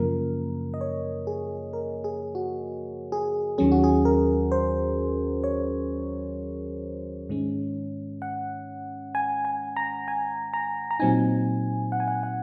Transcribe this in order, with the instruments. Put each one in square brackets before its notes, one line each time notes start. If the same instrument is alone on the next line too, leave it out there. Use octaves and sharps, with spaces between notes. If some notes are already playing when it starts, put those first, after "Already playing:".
Already playing: [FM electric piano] F#2 C#3 F3 A#3 A#4
D#5
C#5
G#4
A#4
G#4
F#4
G#4
D#2 D#3 F#3 C#4 G#4
F#4
G#4
A#4
C5
C#5
G#2 D#3 G#3 C#4
F#5
G#5
G#5
A#5
G#5
A#5
A#5
A#2 F#3 C4 D#4 G#5
F#5
G#5
F#5
F#5